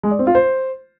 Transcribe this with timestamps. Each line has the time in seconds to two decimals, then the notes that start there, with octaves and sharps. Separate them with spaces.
0.03 G#3
0.11 D5
0.19 C4
0.27 F4
0.35 C5